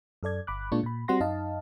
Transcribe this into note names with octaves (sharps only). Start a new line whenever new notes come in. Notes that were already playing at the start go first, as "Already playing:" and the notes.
F#2 A4 D5 G#6
G1 B5 D6 F#6
A#2 G#3 A#3 D4 F4 C#6
A#2 B5
G3 C4 F#4 F#5 C6 A#6
F#2 D#4 D#5 F5 A5